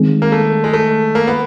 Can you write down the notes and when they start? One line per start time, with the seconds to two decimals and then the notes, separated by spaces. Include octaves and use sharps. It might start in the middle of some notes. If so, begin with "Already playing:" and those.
Already playing: D#3 G#3 C4
0.22 A#3
0.32 A3
0.64 G#3
0.73 A3
1.15 A#3
1.27 B3